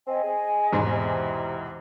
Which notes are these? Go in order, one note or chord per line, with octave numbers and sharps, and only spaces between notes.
C4 D#5 G#5
G#4
E2 G#2 B2
C3